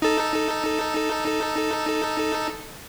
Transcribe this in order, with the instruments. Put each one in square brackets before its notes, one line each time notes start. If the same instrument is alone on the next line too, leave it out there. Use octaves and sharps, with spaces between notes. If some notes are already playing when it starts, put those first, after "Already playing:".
[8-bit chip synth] D#4 A4